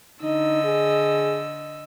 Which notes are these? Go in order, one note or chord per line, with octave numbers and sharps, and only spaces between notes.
D3 D#4 D#5 E6
G#4